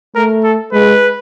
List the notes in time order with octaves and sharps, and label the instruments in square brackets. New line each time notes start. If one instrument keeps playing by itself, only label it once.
[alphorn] A3 [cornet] A#4
[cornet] A4
[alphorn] G#3 [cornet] B4